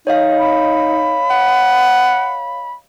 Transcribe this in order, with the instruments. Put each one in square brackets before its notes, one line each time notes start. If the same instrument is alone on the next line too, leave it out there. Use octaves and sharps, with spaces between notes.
[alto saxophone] D#4 [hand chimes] C#5 D#5 F5
[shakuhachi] B5
[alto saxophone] F#5